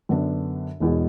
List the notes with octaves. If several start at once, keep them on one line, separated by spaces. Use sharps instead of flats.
F#2 D3 B3 D4
E1 E2 B2